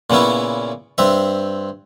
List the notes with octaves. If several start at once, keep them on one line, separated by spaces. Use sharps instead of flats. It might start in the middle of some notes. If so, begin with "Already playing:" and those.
A#2 C#3 B3 C#4 E4
G2 C4 E5